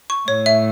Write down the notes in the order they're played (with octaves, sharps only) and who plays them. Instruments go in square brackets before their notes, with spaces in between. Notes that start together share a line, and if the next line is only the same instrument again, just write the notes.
[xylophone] C#6
[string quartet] A2 [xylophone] C#5
[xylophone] E5